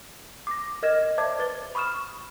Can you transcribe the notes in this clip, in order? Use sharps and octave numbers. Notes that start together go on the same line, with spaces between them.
D6 A#6
A#4 D#5 F6 G#6 A#6 E7
C5 D5 E5 A5 D6 G#6
B4 A6 G7
B5 C#6 D#6 F6 E7